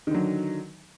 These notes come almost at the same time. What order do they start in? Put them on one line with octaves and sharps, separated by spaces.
D#3 D3 F#3